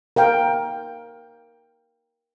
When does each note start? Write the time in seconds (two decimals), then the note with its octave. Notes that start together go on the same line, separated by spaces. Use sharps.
0.16 A#4 F5 G5